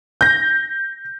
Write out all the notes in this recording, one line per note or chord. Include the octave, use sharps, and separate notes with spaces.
G6 A#6